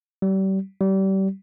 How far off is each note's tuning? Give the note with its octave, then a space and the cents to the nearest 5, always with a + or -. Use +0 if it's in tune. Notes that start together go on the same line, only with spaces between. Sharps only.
G3 -35
G3 -30